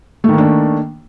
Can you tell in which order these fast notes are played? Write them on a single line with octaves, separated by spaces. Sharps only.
A3 D#3 A#3 D4